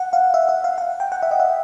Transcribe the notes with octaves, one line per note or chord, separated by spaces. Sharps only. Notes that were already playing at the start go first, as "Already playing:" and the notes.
Already playing: F#5
F5
E5
E5
F5
F#5
G5
F#5
E5
D#5
E5